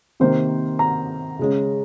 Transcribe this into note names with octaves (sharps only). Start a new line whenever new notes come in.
C3 D#3 A#3 C5
A#5
C#3 G#3 C#4